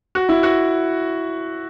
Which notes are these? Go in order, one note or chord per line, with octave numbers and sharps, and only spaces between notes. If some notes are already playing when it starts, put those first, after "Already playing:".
F#4
E4
F#4